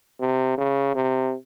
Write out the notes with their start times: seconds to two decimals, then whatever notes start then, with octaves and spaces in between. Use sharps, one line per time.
0.20 C3
0.58 C#3
0.95 C3